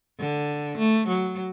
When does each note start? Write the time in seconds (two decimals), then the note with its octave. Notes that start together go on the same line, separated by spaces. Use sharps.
0.20 D3
0.78 A3
1.08 F#3